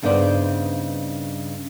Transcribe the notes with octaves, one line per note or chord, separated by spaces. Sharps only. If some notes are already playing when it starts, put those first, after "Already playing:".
G2 C#3 B3 D#4 C5 D5